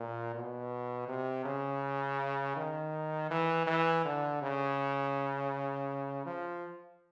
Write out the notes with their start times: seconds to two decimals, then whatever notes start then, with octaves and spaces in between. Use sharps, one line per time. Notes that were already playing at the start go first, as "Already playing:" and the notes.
Already playing: A#2
0.35 B2
1.08 C3
1.45 C#3
2.56 D#3
3.31 E3
3.67 E3
4.05 D3
4.42 C#3
6.26 F3